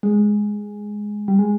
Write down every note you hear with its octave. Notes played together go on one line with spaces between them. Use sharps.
G#3
G3
G#3